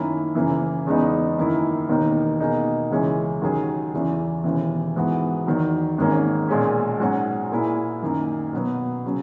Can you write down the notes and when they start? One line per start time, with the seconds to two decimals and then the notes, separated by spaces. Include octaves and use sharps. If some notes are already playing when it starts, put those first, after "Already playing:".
Already playing: F#2 D#3 A#3 C#4 E4
0.35 F#1 F#2 C#3 E3 A#3
0.86 E2 C#3 G#3 B3 D#4
1.38 F#2 D#3 A#3 E4
1.89 E1 D#2 D#3 A#3 D#4
2.40 B2 A#3 D#4 G#4
2.91 C#2 C#3 E3 G#3 C#4
3.42 D#2 D#3 F#3 C#4 G#4
3.94 E2 C#3 E3
4.44 E1 D#2 C#3 E3
4.96 G#2 E3 B3 F#4
5.46 E2 D#3 F#3
5.98 G#1 G#2 D#3 A#3 C#4
6.48 B1 A#2 G#3 C#4
7.00 G#2 F#3 C#4 F#4
7.51 A#2 A#3 E4 G#4
8.02 F#2 D#3 A#3
8.53 B2 F#3 B3
9.06 C#3 F#3